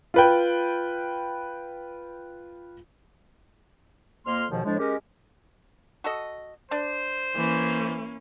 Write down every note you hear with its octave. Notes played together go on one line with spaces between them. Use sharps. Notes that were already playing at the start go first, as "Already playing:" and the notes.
F4 B4 G5
F2 A#3 C6 F6
D#2 G#2 B2 D#3 F3
A2 F3 G#3 D4
G#3 C#4 G4 A#4
F#4 A4 D#5
D4 C5
E3 A#3 C#4